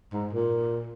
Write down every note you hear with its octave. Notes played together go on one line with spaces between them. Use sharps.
G#2
A#2